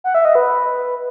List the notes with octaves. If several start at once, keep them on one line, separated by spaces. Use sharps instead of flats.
F#5
E5
D#5
B4
B4